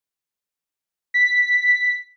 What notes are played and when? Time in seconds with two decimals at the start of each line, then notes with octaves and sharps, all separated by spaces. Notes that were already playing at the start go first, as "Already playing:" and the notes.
1.14 B6